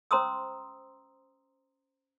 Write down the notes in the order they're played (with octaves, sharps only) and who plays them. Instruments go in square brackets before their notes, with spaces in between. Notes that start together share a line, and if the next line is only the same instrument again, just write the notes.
[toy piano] C#4 C5 A#5 C6 D#6 E6